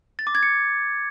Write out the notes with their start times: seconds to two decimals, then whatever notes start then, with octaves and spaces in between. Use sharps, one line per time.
0.19 A6
0.27 D6
0.35 G#6
0.43 C#7